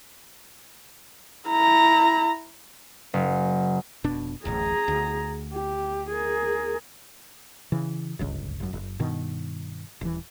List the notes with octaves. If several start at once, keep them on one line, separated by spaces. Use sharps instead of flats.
E4 A#5
F#1
F1 B2 D4
D1 A1 A2 G#4 A#5
D2
G4
G#4 A#4
C#3 E3
D1 G1 C#2
G1 F#2
F#1
G2 B2 D#3
D#1 E3